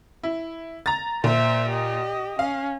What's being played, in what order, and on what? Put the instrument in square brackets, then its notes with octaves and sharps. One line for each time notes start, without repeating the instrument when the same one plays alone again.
[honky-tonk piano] E4
A#5 A6
[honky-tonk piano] A#2 [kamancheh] C5 E5
[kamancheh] G4 D#5
[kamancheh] C#4 [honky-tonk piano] F5